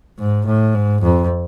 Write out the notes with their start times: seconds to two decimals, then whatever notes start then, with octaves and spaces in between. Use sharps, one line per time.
0.19 G#2
0.46 A2
0.74 G#2
1.02 F2